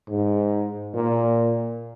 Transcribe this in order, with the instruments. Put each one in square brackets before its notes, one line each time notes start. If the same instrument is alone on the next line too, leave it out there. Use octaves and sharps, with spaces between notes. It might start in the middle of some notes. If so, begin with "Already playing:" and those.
[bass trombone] G#2
A#2